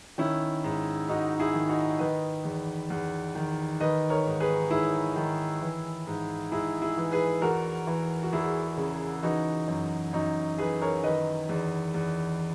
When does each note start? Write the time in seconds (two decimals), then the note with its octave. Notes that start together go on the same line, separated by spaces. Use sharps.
0.18 D#3 C#4 E4
0.64 G#2
1.08 G#2 D#4 F#4
1.40 E4 G#4
1.54 D#3
1.69 D#4 F#4
1.99 D#3 B4 D#5
2.45 E2
2.90 E2
3.35 D#3
3.80 D#3 B4 D#5
4.10 A#4 C#5
4.26 G#2
4.40 G#4 B4
4.71 G#2 E4 G#4
5.16 D#3
5.62 E3
6.07 G#2
6.52 G#2 E4 G#4
6.82 E4 G#4
6.98 E3
7.12 G#4 B4
7.42 E2 F#4 A#4
7.87 E3
8.23 F#4
8.32 E2 E4 G#4
8.78 C#3
9.23 E3 D#4 F#4
9.68 F#2
10.13 F#2 D#4 F#4
10.58 E3 G#4 B4
10.82 A#4 C#5
11.04 D#3 B4 D#5
11.49 E2
11.94 E2